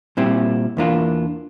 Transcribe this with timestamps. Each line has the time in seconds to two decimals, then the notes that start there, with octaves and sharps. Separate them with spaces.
0.17 A#2 G3 C4 E4
0.77 E2 E3 A#3 D4 F4